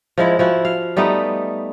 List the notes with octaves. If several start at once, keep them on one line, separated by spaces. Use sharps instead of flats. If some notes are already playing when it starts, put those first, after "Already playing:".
F3 G#3 E4
F3 E4 F#4
F5
G3 A3 B3 D#4